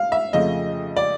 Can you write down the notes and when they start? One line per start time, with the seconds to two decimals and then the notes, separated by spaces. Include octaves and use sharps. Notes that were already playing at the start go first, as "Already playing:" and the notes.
Already playing: F5
0.12 E5
0.33 F2 C#3 F3 A3 D#5
0.97 D5